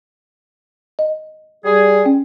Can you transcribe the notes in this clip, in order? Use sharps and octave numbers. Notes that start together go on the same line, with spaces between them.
D#5
G3 G#4
C#4 G5